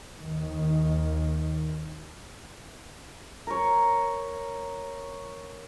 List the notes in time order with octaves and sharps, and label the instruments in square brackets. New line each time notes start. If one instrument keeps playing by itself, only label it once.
[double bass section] D#2 D#3
[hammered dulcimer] A#4 C#5